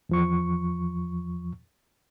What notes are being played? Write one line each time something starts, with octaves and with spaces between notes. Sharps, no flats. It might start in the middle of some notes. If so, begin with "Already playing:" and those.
E2 F3 C#6